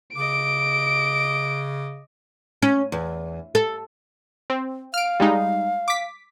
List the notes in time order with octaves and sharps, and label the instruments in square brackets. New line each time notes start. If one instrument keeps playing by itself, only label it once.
[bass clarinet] C#3 [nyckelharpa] D#5 D6 [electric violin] D7
[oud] C#4
E2
A4
[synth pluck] C4
[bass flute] F5 [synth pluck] F6 D7
[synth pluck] G3 G#3 D#4
D6 B6